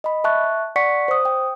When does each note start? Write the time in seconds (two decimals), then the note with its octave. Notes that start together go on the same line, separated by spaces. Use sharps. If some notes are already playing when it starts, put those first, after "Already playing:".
0.04 D#5 B5
0.24 E5 A5 C#6 F#6
0.76 D5 F#5 C#6 B6 C#7
1.08 C5 D#6
1.25 G5